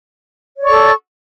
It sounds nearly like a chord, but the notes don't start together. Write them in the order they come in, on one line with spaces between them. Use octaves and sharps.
C#5 D5 C#6 A4